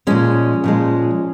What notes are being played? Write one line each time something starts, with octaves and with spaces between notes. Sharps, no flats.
A#2 F3 G#3 C#4
A#2 F3 G#3